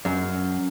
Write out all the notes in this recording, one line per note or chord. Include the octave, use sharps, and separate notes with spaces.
F#2